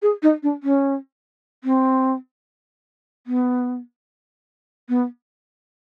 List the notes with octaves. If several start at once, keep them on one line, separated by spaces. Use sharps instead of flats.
G#4
D#4
D4
C#4
C4
B3
B3